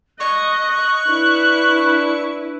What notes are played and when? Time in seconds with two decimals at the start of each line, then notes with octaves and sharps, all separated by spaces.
0.20 D#5 C#6 F#6
1.08 D4 E4 B4